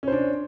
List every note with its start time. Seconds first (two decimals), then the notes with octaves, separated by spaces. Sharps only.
0.03 C#4
0.08 C5
0.12 D4